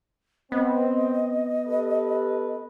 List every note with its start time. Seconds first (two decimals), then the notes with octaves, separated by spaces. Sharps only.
0.52 B3 C4 D#5
1.66 G4 A4 B4